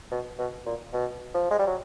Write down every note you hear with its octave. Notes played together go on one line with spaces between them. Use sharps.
B2
B2
A#2
B2
F3
G#3
G3
F#3